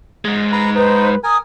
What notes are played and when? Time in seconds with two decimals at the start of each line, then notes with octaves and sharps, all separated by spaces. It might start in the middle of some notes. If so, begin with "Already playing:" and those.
0.25 G#2 G#3
0.52 B4 A#5
0.75 D#4 B4 C5
1.24 A#4 G#5 D#6